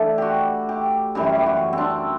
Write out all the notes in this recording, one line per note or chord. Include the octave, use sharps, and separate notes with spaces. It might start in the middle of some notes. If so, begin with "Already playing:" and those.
Already playing: E3 A3 D4 E4
F#4 G4
G4
F#2 E3 G3 G4
G4
F#4
C4 D4